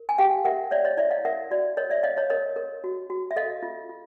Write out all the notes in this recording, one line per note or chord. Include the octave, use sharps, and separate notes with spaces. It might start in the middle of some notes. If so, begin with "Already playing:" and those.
Already playing: A#4
G#5
G4 F5 G5
A#4 E5 F#5
C#5 D5 E5
C#5 D#5
E4 D5 E5
D#5 F5
A#4 E5 F#5
F#4 D5
A#4 C#5 D#5
D5 E5
C#5 D#5 F5
C#5 D#5
A#4 C#5 D#5
A#4
F#4
F#4
E5
A4 D#5 F5
F4
F4